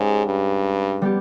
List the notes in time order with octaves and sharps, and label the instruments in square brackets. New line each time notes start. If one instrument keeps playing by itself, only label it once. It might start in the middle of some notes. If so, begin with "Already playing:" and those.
Already playing: [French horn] G#2 [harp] G#3 C#4 G4
[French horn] G2
[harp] G3 B3 G4